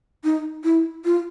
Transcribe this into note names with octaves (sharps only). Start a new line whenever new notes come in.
D#4
E4
F4